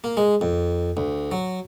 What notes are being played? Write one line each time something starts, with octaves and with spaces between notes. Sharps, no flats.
A#3
G#3
F2
D2
F#3